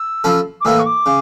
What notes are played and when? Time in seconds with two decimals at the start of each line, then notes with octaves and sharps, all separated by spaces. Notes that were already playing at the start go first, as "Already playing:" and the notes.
Already playing: E6
0.24 F3 C#4 E4 A4
0.60 D6
0.65 A2 E3 A#3 E4 E6
0.79 C#6
0.86 D6
1.06 C#3